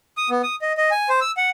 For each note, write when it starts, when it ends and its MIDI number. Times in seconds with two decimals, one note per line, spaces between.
0.17 0.29 87
0.30 0.42 59
0.43 0.55 87
0.62 0.72 75
0.77 0.90 75
0.91 1.09 80
1.09 1.20 72
1.21 1.31 88
1.37 1.50 78